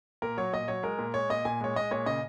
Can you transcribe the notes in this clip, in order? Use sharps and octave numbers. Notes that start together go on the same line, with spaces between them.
A#2 A#4
F#3 C#5
A#2 D#5
F#3 C#5
G#3 A#4
A#2
G#3 C#5
A#2 D#5
A#2 G#5
G#3 C#5
G#3 D#5
A#2 C#5
C#3 D#5